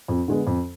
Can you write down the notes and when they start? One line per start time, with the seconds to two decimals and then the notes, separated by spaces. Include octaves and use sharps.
0.08 F2
0.28 D3 G#3 B3
0.47 F2